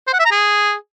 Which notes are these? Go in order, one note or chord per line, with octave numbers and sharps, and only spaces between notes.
C5
F#5
E5
A#5
G#4